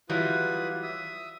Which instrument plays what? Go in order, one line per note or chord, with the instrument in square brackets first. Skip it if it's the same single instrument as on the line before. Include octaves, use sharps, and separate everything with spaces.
[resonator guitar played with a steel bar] E3 F#3 G3 [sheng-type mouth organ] F4 B4 D#6
[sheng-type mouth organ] E5 D#6